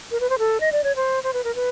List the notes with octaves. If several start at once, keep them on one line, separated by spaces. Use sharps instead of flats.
A#4
B4
C5
A4
D#5
D5
C#5
C5
C5
B4
A#4
B4